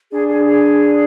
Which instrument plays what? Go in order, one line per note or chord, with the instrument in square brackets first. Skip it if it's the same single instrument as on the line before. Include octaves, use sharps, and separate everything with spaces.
[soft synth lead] D4 [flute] G#4
[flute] G#4
G#4